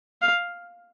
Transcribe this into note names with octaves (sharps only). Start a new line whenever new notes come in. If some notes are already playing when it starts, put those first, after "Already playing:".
F5